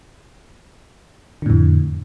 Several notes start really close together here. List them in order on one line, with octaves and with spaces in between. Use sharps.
D3 A2 F2